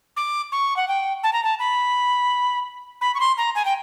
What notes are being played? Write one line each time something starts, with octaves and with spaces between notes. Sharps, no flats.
D6
C#6
F#5
G5
A5
A#5
A5
B5
B5
C#6
C6
A#5
G#5
G5